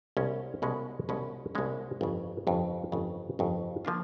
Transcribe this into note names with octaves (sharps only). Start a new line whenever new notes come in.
C2 B2 G#3 C#4
C2 B2 G#3 C#4
C2 B2 G#3 C#4
C2 B2 G#3 C#4
G1 F2 C#3
G1 F2 C#3
G1 F2 C#3
G1 F2 C#3
D3 F3 A#3 D4 F4